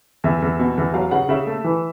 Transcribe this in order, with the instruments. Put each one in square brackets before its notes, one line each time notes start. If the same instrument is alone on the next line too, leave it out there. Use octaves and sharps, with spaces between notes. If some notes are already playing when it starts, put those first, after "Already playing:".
[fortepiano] E2 [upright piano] E5
[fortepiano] E2
B2
E2
[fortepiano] F#3 [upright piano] F5
[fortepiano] C#3 [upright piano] F#5
[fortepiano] C#3 [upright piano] E5
[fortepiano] A3
E3